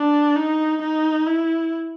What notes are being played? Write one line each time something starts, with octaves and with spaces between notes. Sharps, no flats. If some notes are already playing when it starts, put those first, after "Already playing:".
Already playing: D4
D#4
D#4
E4